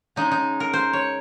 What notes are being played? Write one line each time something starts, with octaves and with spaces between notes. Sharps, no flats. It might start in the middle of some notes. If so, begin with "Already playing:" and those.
C#3 G#3 D#4
D#4
A#4
C5
C#5